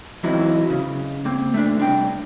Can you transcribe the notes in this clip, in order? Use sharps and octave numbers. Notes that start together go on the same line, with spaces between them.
E3 F#3 C4 D#4 E4 F#4
C#3
A#3 C4
A3 D4
C2 D4 G5